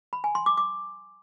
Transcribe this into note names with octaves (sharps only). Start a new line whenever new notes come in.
B5
G#5
C6
D6
D6